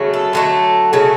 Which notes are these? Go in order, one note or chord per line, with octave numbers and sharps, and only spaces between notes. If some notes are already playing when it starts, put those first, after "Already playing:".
Already playing: C#3 F#3 A3
A4
D3 F#3 A3
C#3 F#3 A3